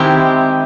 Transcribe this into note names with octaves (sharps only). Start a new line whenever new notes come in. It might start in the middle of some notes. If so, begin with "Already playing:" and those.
Already playing: D#3 G#3 C4 E4 G4